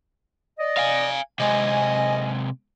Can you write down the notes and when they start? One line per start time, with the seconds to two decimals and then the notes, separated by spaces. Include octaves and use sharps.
0.58 D5 D#5
0.78 F5 G#5
1.40 C3 G#3 D#5 G#5